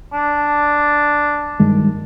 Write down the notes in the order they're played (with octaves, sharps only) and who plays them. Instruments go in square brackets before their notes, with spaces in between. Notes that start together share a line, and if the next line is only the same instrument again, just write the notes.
[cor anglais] D4
[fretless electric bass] G2 D#3 G#3